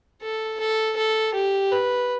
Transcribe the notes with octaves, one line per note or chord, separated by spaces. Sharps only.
A4
A4
A4
G4
B4